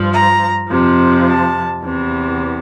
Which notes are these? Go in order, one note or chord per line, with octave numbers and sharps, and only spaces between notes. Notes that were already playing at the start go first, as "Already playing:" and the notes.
Already playing: G2 F3
A#5
F2 C3 F3
A5
E2 C3 E3